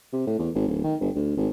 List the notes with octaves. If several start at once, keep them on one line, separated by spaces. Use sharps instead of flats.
C3
A2
E2
G#1
D1
D#3
G1
D2
G#1